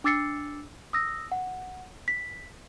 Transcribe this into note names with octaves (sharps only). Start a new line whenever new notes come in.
D4 D6 E6 A6 C7 C#7
D#6 E6 A#6
F#5
B6